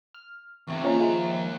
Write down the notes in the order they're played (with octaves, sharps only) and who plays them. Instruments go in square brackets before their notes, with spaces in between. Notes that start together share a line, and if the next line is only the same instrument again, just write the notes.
[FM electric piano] F6
[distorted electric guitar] E2 C3 [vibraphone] E5 G5 C#6
[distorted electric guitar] D#2 A#5 [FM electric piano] C#3 F3 C#4 [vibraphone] A#3 F4 D#5
[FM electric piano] F3 G#3 [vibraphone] C5 E5 F5